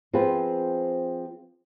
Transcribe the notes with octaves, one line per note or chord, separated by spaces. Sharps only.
F3 C4 F4 G#4 B4